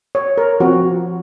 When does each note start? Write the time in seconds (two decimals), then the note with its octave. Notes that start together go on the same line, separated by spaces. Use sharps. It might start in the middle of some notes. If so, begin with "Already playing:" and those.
0.15 C#5
0.38 A#4
0.60 F3 C4 F#4